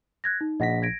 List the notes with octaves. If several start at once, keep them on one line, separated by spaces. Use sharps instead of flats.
F#6 G#6 A#6
D#4
A#1 D#5 F#5 A#6 B6
G#6 A#6 D7